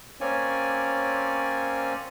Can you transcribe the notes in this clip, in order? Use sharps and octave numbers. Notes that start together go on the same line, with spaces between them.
A#3 C4 C#4 C#5 D5 G#5